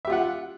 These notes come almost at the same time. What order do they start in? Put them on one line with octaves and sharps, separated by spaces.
E5 G4 F4 F#5